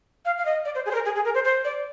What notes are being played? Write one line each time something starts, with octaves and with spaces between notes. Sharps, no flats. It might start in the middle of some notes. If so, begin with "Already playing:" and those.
F5
F5
D#5
D5
C5
G#4
C5
A#4
G#4
G#4
A#4
C5
C5
D5